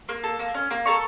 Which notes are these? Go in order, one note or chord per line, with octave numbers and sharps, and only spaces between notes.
A#3
A4
A#3
C#4
A#3
A4 A#5 C#6